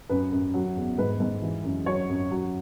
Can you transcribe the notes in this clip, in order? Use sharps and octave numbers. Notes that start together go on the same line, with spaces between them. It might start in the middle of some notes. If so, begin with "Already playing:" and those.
F#2 B4
F#2
F#3
E2
G#2 B4
G#2
E3
F#2
F#3 C#5
F#2
F#3